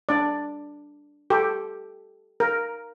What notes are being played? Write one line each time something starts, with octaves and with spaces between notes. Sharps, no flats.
D4 D5
G4 A4
A#4